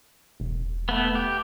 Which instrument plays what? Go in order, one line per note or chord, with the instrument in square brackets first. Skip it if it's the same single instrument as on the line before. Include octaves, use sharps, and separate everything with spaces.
[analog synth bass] E1
[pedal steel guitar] A3 B3
G4